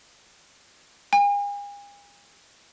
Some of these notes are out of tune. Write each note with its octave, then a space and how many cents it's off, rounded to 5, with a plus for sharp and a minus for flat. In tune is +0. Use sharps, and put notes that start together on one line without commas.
G#5 -40